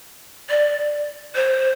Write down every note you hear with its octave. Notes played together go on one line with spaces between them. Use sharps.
D5
C5